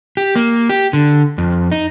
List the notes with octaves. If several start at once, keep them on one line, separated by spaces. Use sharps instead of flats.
G4
A#3
G4
D3
F2
D#4